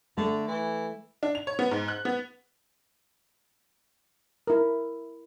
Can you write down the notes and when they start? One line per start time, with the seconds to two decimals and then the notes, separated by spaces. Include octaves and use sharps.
0.17 D3 A3
0.48 E3
1.23 D4
1.35 F7
1.47 C#5
1.59 B3
1.71 G#2
1.88 F#6
2.05 B3
4.47 E4 A#4